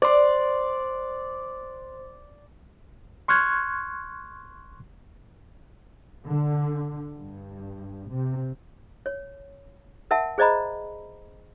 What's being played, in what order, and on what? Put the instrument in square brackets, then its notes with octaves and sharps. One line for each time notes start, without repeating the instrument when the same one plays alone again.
[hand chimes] C5 C6 [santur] D5
[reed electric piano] C6 C#6 F6 F#6 G#6
[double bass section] D3
G2
C3
[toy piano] C#5
A#4 E5 F#5 A5
G#4 C5 D5 D#5 A#5 B5